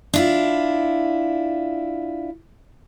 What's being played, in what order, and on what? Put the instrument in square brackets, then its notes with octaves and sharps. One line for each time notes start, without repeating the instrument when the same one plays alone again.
[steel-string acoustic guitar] D4 E4 F4